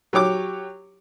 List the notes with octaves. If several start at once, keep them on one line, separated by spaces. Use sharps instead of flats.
F#3 G4 C#5 D6